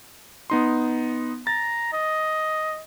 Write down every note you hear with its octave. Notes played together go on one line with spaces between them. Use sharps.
B3 D#4 C6
A#5 A6
D#5